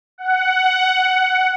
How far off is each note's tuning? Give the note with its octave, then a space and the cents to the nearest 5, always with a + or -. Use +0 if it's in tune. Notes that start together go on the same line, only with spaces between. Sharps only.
F#5 +10